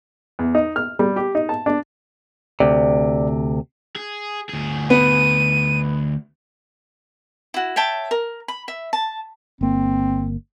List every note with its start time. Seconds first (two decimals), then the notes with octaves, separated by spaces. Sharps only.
0.39 E2
0.55 D#4
0.76 F6
0.99 G3
1.16 G4
1.35 D#4
1.49 A5
1.66 D4
2.60 D2 C3 D5
3.96 G#4
4.49 D2 G#4
4.90 B3 D#7
7.54 E4 F#4
7.76 C#5 E5 G5 A5
8.11 A#4
8.48 B5
8.68 E5
8.93 A5
9.61 G1 A#3 C4